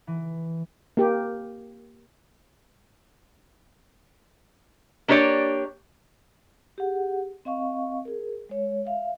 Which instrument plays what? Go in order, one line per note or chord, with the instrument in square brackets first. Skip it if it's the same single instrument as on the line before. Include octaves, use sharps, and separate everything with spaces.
[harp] E3
[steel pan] A#3 G4
[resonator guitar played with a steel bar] A#3 D4 G4 C#5 D5
[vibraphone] G4 G#4 F#5
C4 D#5 F5 C#6
G#4 A#4
G#3 C#5
E5 F5